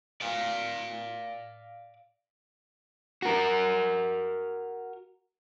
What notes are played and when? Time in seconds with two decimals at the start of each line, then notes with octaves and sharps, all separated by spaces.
0.21 D5 F5
3.22 F#4 A#4